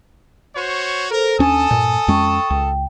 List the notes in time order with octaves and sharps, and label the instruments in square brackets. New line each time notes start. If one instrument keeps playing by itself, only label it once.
[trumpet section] F#4 C5 C#5
[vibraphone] A4 C5 [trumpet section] A#4
[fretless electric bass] D#2 C#4 D4 [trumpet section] A4 A5 D#6 [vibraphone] G#5
[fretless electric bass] G2 A#2
[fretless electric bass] F2 G#3 C#4 [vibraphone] G5 C#6
[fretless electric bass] C#2 [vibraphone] G5